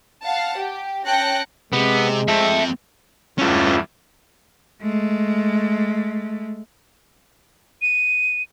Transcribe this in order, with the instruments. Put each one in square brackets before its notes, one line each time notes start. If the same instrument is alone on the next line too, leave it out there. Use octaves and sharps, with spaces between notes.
[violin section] F5 F#5 A5
G4
C#4 G5 A5 F#6 A#6 C#7
[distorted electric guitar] C3 [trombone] G#3 [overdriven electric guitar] B3
[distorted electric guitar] F3 C4 [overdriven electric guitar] E5 A5
[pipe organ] E2 G2 A3 [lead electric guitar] C#4 F4
[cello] G#3 A3
[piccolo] D#7